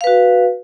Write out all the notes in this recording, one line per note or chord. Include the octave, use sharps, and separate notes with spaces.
F#4 B4 F5